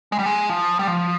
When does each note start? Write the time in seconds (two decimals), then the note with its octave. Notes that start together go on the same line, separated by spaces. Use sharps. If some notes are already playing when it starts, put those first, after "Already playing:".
0.12 G#3
0.19 G3
0.26 G#3
0.49 F3
0.79 G3
0.87 F3